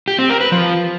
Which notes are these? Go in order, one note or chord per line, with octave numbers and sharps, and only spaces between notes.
G4
C4
A#4
B4
F3